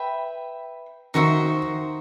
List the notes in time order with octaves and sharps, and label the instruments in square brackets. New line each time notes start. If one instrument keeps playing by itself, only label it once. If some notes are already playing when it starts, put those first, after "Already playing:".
Already playing: [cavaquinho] B4 E5 G5 B5
[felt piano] D#3 [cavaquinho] D#4 F#4 C5 E5